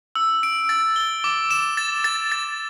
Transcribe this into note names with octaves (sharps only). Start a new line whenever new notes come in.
E6
D7
A6
G7
D6
E7
A6
A6
A6